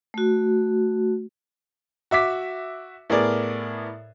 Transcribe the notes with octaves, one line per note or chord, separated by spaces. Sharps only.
A3 F#4
F#4 E5 D6 B6
A2 B3 G#4 A#4 D5